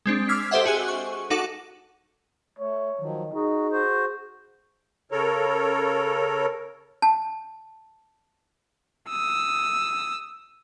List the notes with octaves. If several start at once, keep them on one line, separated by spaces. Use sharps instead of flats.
G#3 C4 D4
D6 E6 F6 G#6 B6 C7
G4 A4 C5 D#5 E5 F#5
F#4 G#4 G#5 F#6
C#6
D#4 F#4 A4 F#5 D6
A3 C#5
D#3 F3 F#3
D#4 F#4 G#4
F#4 C5
C#3 A4 A#4 C#5
A5
D#6 E6